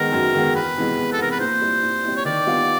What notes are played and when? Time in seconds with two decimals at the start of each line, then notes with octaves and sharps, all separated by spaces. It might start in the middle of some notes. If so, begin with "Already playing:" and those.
Already playing: D#3 G#3 B3 A#4
0.13 F#2
0.34 D#3 G#3 B3
0.55 E2 B4
0.77 C3 E3 G#3 B3
0.97 E2
1.12 A4
1.19 C3 E3 G#3 B3 A#4
1.31 B4
1.40 A#2 C5
1.61 G3 C4 E4
1.83 A#2
2.04 G3 C4 E4
2.17 C#5
2.25 D#3 D5
2.47 G3 B3 D4 F4